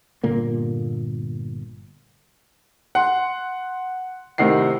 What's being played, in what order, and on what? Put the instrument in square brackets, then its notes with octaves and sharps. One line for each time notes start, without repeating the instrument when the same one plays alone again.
[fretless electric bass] G1 A#2 A#3
[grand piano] F#5 C6
A2 C3 D#3 F#5 C7